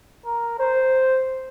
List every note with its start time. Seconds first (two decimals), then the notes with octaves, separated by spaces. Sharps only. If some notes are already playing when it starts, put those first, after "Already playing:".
0.26 A#4
0.60 C5